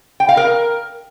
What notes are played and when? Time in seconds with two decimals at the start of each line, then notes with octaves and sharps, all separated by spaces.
0.20 G5
0.29 F5
0.37 A#4